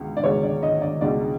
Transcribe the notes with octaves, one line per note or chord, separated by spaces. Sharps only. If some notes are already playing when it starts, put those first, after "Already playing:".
Already playing: C#2 B2
D5
C#2 B2 G#3 C#5
D5
D#5
D5
C#2 B2 G#3 D5